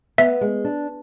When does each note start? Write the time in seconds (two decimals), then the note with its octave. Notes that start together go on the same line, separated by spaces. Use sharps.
0.18 B3 E5
0.41 G#3
0.64 D4